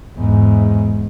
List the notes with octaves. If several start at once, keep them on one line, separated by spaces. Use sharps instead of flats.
E2 G#2